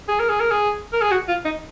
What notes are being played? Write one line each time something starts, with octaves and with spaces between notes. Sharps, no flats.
G#4
A#4
G#4
A#4
G#4
A#4
G#4
F#4
F4
D#4